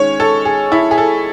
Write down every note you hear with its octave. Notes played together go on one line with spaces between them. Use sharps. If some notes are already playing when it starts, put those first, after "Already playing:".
Already playing: D#3 G#3 C#4 C#5
A4
G#4
E4
G#4
A4